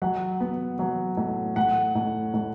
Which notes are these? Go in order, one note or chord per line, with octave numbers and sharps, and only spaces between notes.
F#3 F#5
B3
F#3
A2
A2 F#5
A2
A2